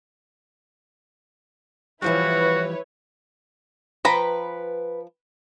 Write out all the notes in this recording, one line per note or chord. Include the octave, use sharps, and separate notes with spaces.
E3 F3 G3 E4 F#4 B4 C#5
F3 B4 G5 A#5 B5